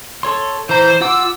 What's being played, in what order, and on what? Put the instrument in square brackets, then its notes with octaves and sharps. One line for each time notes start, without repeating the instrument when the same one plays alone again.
[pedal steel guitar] A4 C#5 C6
[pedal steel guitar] E3 A#5 [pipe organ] C5
[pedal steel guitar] F4 F#5 D6 [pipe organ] E6